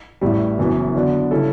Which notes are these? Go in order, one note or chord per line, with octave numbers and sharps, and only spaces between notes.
A1 A2 G3
F#1 F#2 E3 B3
D3 F#3 B3 D4
C#3 G3 C#4 E4 A4